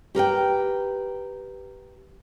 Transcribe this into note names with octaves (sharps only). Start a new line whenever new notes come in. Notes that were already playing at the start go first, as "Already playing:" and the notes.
G4 A#4 B4 G5